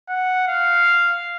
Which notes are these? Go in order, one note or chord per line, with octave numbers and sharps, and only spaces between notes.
F#5
F5